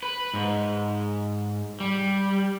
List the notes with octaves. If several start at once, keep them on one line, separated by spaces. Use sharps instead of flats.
B4
G#2
G3